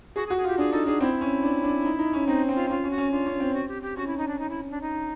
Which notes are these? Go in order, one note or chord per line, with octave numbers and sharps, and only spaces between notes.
F#4 G#4
G#4
F#4
G#4
F4
G4
D4 G#4
D#4 A4
D4 G#4
C4 E4
C#4
D4
D4
D#4
D#4
C#4
C4 D#4
C4
F4
C#4 F4
C#4
F#4
C#4
D4 F4
C#4
C4
F#4
G4
G4
C#4 F#4
E4
D#4
D4
D#4
E4
D4
D#4